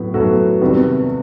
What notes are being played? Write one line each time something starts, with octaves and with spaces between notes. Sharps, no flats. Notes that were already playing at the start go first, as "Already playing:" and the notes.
Already playing: A2 F#3 B3
A2 F#3 B3 F#4 A4
C3 D#3 G3 B3